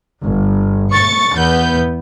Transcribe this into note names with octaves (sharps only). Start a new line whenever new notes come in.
G1
C#6 A6 C#7
E2 B3 G6